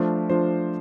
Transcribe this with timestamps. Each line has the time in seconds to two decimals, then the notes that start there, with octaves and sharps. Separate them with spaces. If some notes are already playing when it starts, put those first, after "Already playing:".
Already playing: F3 A3 D4 F4 C5
0.30 F3 A3 D4 F4 C5